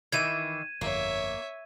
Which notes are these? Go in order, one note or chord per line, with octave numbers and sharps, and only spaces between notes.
D#3 E3 E5 G#6 D#7 E7
G1 F2 D3 A#3 C#5 E5